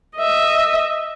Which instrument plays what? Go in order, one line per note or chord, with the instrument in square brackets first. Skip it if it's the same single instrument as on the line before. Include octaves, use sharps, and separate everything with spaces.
[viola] D#5 E5